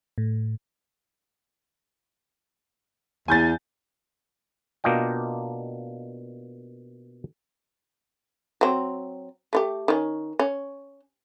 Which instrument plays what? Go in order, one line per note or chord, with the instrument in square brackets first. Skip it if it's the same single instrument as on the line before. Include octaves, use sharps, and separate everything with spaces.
[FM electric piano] A2
[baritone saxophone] E2 [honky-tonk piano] G#5 G6 A6
[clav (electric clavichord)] B2 A#3 D4 F4 D#5 G5
[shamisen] F#3 C4
A3 F4 G4
D#3 C#4
C#4